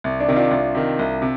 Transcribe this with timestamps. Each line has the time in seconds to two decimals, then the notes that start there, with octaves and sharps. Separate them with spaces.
0.04 C2
0.20 D4
0.28 C3 D#3
0.36 D4 F4
0.51 C2
0.75 C3 D#3
0.99 C2
1.22 C3